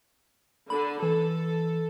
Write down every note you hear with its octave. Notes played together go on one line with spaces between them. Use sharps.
D3 B5
E3 A4